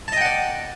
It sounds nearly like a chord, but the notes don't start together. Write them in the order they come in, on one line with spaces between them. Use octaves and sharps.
A5 D#5 G5 F#5 D5